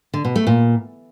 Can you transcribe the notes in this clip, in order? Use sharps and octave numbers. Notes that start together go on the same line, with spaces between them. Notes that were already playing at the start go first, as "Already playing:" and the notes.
D3
B2
A3
A#2